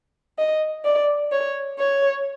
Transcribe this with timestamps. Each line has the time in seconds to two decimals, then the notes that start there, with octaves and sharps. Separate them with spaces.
0.39 D#5
0.85 D5
1.32 C#5
1.78 C#5